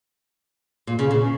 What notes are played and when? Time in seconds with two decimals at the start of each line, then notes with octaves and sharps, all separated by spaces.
0.87 A#2
0.99 C#3
1.11 C#3